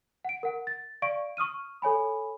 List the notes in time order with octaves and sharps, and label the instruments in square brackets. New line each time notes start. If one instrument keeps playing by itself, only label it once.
[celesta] F#5 D7
A#4 F#5
A6
D5 F5 C#6 D7
C#6 D#6 F6 D#7
A4 C#5 G#5 B5